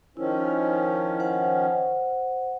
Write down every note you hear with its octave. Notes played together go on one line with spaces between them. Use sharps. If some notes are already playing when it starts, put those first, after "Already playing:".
D#3 F3 C#4 E4
C5 F#5